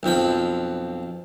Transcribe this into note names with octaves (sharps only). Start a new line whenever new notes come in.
B1 F2 F3 B5